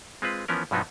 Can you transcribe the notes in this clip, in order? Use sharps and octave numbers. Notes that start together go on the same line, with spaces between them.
G#3 C4 F4 B4
E3 F3 B3 C#4 A#4
G2 B2 F3 F#3 B3 D#4